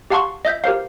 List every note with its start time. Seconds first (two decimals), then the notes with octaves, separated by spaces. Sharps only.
0.10 G4 F5 F#5 A5 C6 C#6
0.45 D#5 E5 G6 B6
0.64 G4 A#4 C5 F5